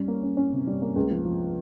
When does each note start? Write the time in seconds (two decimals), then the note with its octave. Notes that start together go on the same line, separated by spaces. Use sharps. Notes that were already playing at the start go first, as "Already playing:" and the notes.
Already playing: G3 C#4
0.08 A#3
0.23 C#4
0.37 C#4
0.53 C3
0.67 G3
0.82 A#3
0.96 C#2
1.11 F3
1.25 F3